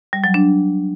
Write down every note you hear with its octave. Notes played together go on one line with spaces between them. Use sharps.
G3
F#3
D4